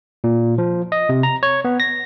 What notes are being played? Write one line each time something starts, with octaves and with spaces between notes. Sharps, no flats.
A#2
F3
D#5
C3
A#5
C#5
B3
A#6